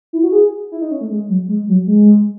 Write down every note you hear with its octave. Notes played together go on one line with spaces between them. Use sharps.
E4
F#4
G#4
E4
D#4
C#4
A3
G#3
F#3
G#3
F#3
G#3